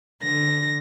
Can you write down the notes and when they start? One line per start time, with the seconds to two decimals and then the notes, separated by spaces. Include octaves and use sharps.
0.22 D3 A#6